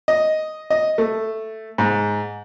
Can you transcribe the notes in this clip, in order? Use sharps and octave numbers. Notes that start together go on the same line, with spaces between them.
D#5
D#5
A3
G#2